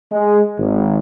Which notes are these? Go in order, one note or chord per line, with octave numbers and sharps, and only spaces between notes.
G#3
G#1